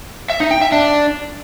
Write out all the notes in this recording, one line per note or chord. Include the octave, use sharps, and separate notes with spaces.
E5
D#4
G5
E5
D4